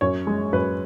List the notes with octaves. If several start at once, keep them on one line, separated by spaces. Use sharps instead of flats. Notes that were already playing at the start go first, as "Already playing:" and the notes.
F#2 C#5
G#3
F#2 B4